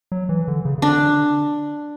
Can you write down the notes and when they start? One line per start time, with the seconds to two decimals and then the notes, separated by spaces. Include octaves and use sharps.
0.12 F#3
0.29 E3
0.48 D3
0.65 C#3
0.78 C#3
0.82 D3 D4